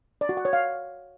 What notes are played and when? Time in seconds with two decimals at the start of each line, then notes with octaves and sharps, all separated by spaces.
0.21 D5
0.29 F#4
0.37 F#5
0.45 C#5
0.53 F5